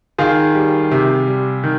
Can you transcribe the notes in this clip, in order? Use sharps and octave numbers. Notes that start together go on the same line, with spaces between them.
D#3 F4 G#4
G3
C3
G3
D#3